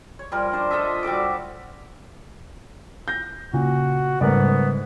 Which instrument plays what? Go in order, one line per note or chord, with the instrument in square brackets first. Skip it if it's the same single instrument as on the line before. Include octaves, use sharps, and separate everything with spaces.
[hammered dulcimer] C#5
F3 G3 F4 A#4
D4 C5
F4 A4 D#5 E5
G3 F#4 A4 D6
[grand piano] G6 A#6
[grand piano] A#2 [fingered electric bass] C#3 [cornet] F#4
[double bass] G#2 [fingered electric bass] C#3 G3 [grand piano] A3 A#4 D5 [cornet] B3